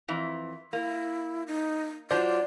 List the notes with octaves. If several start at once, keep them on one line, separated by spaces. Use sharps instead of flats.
F2 E3
A#3 E4
D#4
F#3 D4 F4 C5 D5